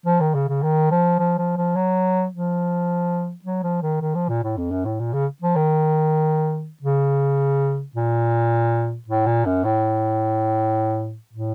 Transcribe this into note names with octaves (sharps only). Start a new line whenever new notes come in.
F3
D#3
C#3
C#3
D#3
F3
F3
F3
F3
F#3
F3
F#3
F3
D#3
D#3
F3
A#2
A2
F2
F#2
A2
A#2
C#3
F3
D#3
C#3
A#2
A2
A#2
F#2
A2
A2